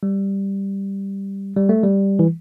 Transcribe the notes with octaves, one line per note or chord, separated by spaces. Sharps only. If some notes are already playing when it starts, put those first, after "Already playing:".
G3
G3
A3
G3
E3